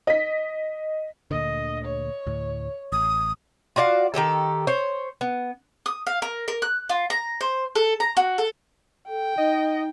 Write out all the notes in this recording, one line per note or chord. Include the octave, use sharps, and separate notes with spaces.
D#5 B6
D2 A#2 D3 D#5
C#5
D2 A2
A1 D#6
F4 F#4 D5 F5
D#3 F3 G4 A4
C5 C#5
B3
D#6
F5
A#4
A#4
F#6
F4
A#5
C5
A4
A#5
F#4
A4
A4 G5
D#4 D#5